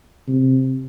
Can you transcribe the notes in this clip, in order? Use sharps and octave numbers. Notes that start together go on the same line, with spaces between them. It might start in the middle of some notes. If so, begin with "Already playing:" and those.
C3